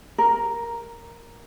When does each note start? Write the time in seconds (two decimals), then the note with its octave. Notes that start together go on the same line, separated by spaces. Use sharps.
0.18 A#4